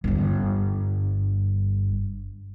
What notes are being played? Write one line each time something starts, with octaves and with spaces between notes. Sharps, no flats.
G1 G2